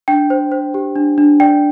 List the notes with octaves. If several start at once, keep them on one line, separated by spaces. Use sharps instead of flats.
D4 G5
C5
C5
G4
D4
D4
D5 G5